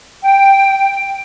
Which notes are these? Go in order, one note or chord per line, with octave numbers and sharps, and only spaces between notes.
G5